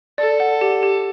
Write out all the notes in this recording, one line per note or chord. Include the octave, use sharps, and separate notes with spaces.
A4 D5
F#5
G4
G4